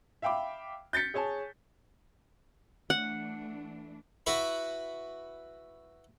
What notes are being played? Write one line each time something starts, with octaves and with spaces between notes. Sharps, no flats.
E5 F5 G5 B5 D6
G6 A6 B6 C#7
G#4 C#5 G#5 A5
E3 A3 D4 F#5
E4 F#4 B4